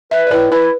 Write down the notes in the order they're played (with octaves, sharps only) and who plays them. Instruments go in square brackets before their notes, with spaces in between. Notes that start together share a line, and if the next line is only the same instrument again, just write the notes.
[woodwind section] B4 [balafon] E5
[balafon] D5
[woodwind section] A2 [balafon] B4
[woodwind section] E4 [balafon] B4